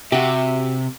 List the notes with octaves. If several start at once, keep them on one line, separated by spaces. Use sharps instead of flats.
C3 F#4 G4 E5